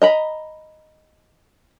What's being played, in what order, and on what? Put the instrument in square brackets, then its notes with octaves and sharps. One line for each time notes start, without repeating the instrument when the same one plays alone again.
[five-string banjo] D#5 A#5 B5